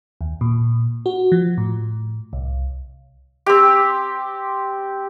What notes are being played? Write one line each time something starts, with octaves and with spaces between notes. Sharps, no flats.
D#2
A#2
F#4
F3
A2
C2
C4 G4